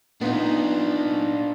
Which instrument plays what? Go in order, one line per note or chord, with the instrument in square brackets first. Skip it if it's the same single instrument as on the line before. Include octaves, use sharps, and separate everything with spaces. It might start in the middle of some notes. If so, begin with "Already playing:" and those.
[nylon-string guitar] B3 D#4 [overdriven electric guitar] D4 F4